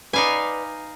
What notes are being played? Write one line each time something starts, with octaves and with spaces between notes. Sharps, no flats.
D#4 B4 D5 F5 G#5